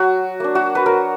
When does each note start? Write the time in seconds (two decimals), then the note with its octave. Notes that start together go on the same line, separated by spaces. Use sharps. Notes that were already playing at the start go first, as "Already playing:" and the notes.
Already playing: F#3 F#4
0.40 A#3 D4
0.55 F#4
0.75 B4
0.86 F#3 A#4